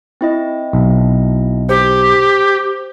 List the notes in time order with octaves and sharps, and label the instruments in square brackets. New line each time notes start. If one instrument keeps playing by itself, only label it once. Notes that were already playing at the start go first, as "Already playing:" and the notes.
[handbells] C4 E4 D#5
[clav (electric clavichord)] B1
[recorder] G4 [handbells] C5